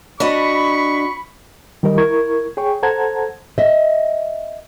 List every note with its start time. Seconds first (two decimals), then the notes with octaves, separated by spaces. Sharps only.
0.20 D4 F#4 D#5 B5 C#6
1.83 D#3 G3 G4 A#4 D#5
1.98 E4 A#4 C#6 G#6
2.57 G#4 C#5 G5 C#6
2.83 A4 C5 F#5 A5 A#5 G#6
3.58 D#5 E5